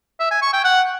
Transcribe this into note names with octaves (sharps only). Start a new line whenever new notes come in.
E5
G#5
C#6
G5
F#5